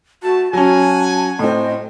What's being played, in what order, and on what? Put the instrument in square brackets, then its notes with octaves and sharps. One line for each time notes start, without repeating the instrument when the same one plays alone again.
[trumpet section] A3 A5 [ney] F#4
[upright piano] F#3 C#4 [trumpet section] F#5 G#5 [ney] A5
[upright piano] A2 C4 [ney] D#5